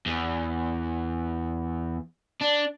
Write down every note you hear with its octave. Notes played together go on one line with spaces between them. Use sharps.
E2
D4